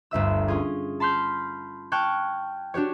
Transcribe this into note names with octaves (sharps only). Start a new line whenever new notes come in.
G1 D2 E5 E6
C#4 F4 G#4
A5 B5 C6 F6 G6
G5 A5 C#6 F6 F#6 G#6
D4 F#4 G4 C#5